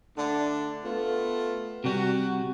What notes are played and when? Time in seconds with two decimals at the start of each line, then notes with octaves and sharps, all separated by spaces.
0.17 D3 A3 D4
0.84 A3 B3 F4
1.84 C3 G3 F#4